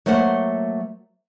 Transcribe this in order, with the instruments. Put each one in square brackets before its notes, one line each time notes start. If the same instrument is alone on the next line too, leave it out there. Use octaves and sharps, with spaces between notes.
[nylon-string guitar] F#3 A3 A#3 C5 F#5